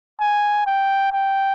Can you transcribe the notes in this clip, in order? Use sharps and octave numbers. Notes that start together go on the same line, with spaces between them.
G#5
G5
G5